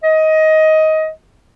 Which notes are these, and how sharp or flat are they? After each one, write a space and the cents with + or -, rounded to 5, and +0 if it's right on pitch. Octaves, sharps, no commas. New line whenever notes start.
D#5 +15